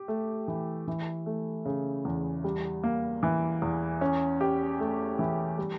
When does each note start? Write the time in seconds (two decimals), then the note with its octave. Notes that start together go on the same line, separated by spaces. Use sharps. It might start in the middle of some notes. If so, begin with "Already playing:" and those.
Already playing: G4
0.08 A3
0.48 E3
0.87 E3
1.26 A3
1.65 C#3
2.05 E2
2.44 G3
2.83 A#3
3.23 E3
3.62 E2
4.01 C#4
4.41 G4
4.80 A3
5.19 E3
5.58 G3